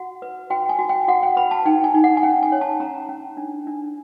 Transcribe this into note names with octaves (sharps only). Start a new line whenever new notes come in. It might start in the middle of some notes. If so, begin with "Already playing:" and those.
Already playing: F#4 F#5
B4
F#4 G5
G#5
F#4
G5
F#4 F#5
G5
B4 B5
A5
D#4 G5
G#5
D#4
F#5
G#5
C#4 G5
G#5
C#5
A5
C#4 A#5
C#4
D4
D4